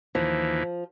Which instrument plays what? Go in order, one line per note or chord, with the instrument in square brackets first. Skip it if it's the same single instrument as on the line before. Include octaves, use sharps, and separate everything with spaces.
[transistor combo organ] D#2 E3 [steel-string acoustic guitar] F3